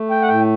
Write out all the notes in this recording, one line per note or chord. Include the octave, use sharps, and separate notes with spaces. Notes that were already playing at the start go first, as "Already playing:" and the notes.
Already playing: A3
G5
F#5
A2 G5